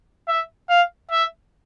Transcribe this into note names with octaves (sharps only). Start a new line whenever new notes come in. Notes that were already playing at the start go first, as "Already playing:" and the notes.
E5
F5
E5